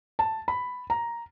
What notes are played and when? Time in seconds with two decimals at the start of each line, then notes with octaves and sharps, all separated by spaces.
0.19 A5
0.48 B5
0.90 A#5